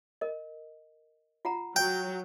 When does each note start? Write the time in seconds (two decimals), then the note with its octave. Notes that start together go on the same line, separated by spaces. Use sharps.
0.21 A#4 D#5
1.45 F4 F#5 A#5
1.76 F#3 G5